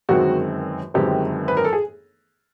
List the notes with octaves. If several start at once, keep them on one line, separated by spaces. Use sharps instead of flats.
G1 F#2 D#3 G#3 C4 F#4
G1 F#2 D#3 G#3 C4 G4
B4
A#4
A4
G#4